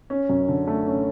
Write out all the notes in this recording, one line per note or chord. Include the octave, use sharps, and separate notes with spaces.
C#4
F#2
D3
A3
C#4